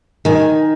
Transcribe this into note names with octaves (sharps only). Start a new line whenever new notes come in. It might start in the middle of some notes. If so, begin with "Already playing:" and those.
D#3 G#5